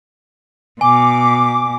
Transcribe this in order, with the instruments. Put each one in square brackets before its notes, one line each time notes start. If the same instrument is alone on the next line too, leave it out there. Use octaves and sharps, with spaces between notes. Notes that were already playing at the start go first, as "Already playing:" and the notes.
[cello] B2 [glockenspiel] G#5 [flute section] D6